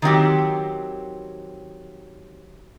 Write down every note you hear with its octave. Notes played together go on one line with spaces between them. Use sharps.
D#3 F#3 C4 G4